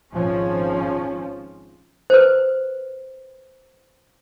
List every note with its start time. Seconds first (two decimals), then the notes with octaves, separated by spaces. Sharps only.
0.14 G#1 F3 C#4
2.10 B4 C5